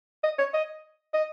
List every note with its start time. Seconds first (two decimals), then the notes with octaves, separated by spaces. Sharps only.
0.24 D#5
0.39 C#5
0.54 D#5
1.14 D#5